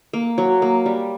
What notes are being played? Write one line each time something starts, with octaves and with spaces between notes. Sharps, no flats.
A#3
F#3
A#3
G3